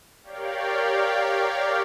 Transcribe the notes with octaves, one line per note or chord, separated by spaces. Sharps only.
G4 A#4 C#5 D5 F5 G5